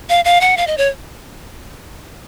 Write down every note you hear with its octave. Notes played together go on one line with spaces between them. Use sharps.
F5
F5
F#5
F5
D#5
C#5